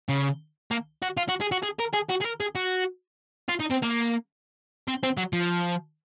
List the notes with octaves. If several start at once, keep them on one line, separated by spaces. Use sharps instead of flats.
C#3
A#3
F#4
F4
F#4
G#4
F#4
G#4
A#4
G#4
F#4
G#4
A#4
G#4
F#4
F4
D#4
C4
A#3
C4
C4
F#3
F3